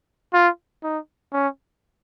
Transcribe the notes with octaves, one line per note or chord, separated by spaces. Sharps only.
F4
D#4
C#4